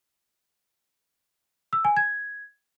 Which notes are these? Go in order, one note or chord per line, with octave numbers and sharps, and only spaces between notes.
E6
G#5
G#6